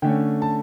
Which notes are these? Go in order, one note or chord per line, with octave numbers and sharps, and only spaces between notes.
D3 A3 C#4 G5
A5